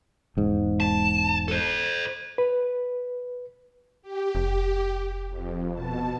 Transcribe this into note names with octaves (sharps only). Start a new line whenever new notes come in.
E1 G#2
A5
A4 C5
B4
G4
F1
F2
B2 A5